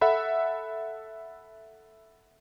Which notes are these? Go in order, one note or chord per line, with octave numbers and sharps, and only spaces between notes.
A4 E5 F#5 B5